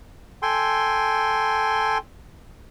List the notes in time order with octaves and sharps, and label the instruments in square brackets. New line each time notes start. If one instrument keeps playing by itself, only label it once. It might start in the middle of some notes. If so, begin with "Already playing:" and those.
[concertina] A4 G5 G#5 C6